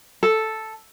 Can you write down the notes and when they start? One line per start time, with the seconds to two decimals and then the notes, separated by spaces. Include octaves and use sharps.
0.23 A4